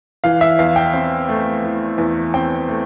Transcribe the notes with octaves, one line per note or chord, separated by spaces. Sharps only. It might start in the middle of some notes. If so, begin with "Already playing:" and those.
E3 F5
E5
E2 F5
G5
C4
A3
E3
E2
C4 G5
A3